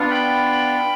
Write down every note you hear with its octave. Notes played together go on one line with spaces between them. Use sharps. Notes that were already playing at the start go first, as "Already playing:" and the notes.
Already playing: B3 D4 F4
G5 B5